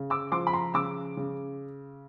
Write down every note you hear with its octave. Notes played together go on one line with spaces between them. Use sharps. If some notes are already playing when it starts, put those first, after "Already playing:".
Already playing: C#3
D6 E6
F3 C6 D6
B5
A#5 C6
C#3 D6 E6
C#3